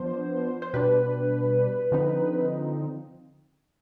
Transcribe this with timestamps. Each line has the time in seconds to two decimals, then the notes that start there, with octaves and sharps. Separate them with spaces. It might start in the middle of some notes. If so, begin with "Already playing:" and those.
Already playing: F3 B3 D4 C5
0.62 C5
0.73 B2 G3 D4 B4
1.92 D3 F3 C4 D#4